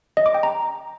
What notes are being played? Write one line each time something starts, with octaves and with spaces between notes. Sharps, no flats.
D#5
D6
G5
A#5